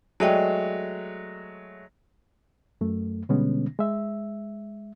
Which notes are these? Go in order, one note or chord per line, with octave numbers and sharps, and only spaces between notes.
F#3 G#3 A3 D5 D#5 G5
F#2 A3
B2 D3 G3 G#3 B3 C#4
G#3 E5